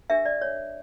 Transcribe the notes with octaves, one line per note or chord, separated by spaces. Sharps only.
D4 G4 A#4 E5
D5
C#5